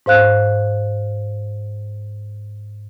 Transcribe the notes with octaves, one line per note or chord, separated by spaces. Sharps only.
G#2 C5 F5 F#6